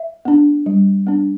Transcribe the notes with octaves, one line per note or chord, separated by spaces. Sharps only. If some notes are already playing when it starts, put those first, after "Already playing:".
Already playing: E5
B3 D4
G3
B3 D4